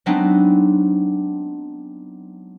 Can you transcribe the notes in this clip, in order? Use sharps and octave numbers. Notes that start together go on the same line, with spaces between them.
F#3 G#3 B3 C4 D4 D#4